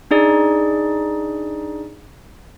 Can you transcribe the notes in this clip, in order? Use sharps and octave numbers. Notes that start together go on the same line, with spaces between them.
D4 D#4 G#4 D5